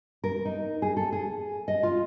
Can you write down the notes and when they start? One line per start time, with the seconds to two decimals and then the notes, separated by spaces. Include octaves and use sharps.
0.24 A#4
0.45 D#4
0.82 G#4
0.97 A4
1.13 G#4
1.68 D#5
1.83 F4